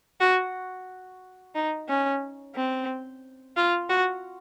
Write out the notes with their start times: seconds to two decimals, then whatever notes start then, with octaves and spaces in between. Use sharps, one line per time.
0.21 F#4
1.55 D#4
1.89 C#4
2.56 C4
3.57 F4
3.89 F#4